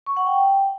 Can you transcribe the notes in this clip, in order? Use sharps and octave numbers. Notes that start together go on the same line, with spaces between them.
C#6
F#5
G5